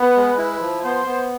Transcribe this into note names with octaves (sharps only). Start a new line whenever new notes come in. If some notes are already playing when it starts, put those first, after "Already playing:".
Already playing: B3 B4
G#3
E4
F3
B3 C5
B3